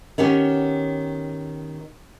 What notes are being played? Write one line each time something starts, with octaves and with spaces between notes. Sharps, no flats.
D#3 B3 C#4 G4